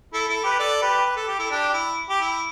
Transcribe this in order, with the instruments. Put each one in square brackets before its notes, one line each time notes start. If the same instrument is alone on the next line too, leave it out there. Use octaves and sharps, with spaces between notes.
[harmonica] E4 A4
E4 A4
G4 B4
A4 D5
G4 B4
B4
A4
G4
E4 A4
D4 G4
G4
E4
G4
E4